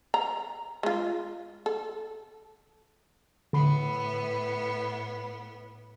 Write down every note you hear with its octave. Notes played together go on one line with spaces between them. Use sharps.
A#5
G#3 F4
A4
A2 D3 B3 B5 C7